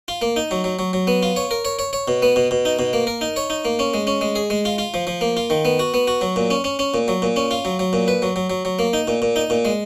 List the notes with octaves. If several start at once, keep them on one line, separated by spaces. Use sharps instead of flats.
F4
A#3
D#4
F#3
F#3
F#3
F#3
B3
F4
C#5
A#4
C#5
C#5
C#5
B2
B3
B2
B2
D#4
B2
A#3
A#4
D#4
C#5
D#4
A#3
C#4
G#3
C#4
G#3
G#4
G#3
F4
F4
F3
F3
A#3
F4
D#3
B3
F#4
B3
F#4
F#3
A#2
C#4
C#4
C#4
A#2
F#3
A#2
C#4
F4
F#3
F#3
A#2
B4
F#3
F#3
F#3
F#3
A#3
D#4
A#2
A#2
D#4
A#2
G#3